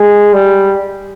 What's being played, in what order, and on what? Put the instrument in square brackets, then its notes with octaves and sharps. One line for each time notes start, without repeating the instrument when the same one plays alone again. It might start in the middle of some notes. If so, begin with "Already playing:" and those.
Already playing: [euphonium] G#3
G3